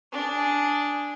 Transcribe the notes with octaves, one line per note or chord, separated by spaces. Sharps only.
D4 G#4